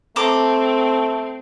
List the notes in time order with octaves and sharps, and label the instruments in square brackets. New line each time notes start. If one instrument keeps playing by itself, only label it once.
[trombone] A3 [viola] C4 [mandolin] A4 [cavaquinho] A#5 D6